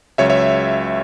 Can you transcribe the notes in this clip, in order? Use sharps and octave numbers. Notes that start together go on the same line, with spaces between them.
C#2 C#3 F#3 C#5 E5
C#5 E5